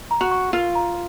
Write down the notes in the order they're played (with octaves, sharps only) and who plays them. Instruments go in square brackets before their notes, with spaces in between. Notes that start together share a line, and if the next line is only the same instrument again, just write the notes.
[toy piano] A#5
[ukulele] F#4
[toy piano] C#6
[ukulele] F4 [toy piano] A#4
[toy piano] A#5